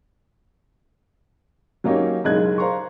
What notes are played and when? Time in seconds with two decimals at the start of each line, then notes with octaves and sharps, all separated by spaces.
1.84 F#3 A#3 C#4 D#4 G4 C#5
2.24 F#1 B1 G#3 D#5 F#6 G#6
2.58 C5 F5 A#5 C6 C#6